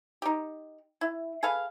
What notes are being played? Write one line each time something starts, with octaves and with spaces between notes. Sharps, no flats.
D#4 G4
E4
G#4 A4 B4 F5